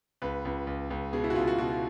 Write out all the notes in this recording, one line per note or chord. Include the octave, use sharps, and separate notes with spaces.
C#2 B4
C#2
C#2
C#2
B2 G#4
E4
F#4
C#2 F4
F#4
B2 F#4